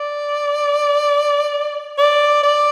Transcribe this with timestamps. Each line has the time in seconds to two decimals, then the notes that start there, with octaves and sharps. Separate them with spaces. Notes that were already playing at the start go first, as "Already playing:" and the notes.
Already playing: D5
1.98 D5
2.43 D5